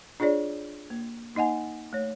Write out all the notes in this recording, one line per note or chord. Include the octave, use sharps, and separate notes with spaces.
D4 F4 G#4 C#5 D5
A#3
A#3 D#4 D#5 F#5 G#5
A3 C#5